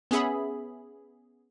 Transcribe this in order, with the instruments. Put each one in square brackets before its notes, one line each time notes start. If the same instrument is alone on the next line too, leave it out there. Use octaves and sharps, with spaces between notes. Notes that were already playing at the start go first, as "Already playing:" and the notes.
[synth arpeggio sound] B3 C#4 G#4 E5 B5